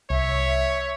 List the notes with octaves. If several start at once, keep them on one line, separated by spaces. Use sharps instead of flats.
C2 C#5 E5